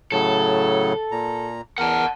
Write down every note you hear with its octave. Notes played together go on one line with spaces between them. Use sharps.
A2 C#3 F#3 A4
A#2 A#5
E2 A#4 F#5 A5